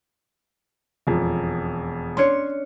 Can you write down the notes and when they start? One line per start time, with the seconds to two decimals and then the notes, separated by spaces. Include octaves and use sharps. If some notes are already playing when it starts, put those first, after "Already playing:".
1.07 E1 F2
2.17 C#4 D4 C#5 C6